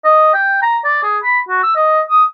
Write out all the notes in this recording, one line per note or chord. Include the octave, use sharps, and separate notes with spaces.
D#5
G5
A#5
D5
G#4
B5
F#4
E6
D#5
D#6